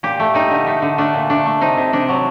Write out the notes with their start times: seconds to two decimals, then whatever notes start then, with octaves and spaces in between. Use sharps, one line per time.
0.03 A#2 G4
0.19 A3
0.35 G3 D#4
0.51 D3
0.67 A3
0.82 D3
0.98 A3 D4
1.14 A#2
1.30 A3 D4
1.46 A3
1.61 C3 D#4
1.77 C3
1.93 C3 D4
2.09 F#3